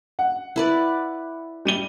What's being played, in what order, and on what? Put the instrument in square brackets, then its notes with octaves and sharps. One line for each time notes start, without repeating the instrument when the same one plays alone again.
[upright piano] F#5
[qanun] E4 B4 D5
[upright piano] G3 D#7 G7